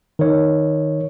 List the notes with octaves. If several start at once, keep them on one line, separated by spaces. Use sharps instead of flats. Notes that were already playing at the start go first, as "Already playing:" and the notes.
D#3 C#5